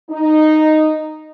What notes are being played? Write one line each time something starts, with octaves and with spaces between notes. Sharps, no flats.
D#4